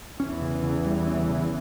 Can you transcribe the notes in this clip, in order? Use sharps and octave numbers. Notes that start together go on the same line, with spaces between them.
E2 E3 C#4
C#3
C#3
G3
C#4
C#3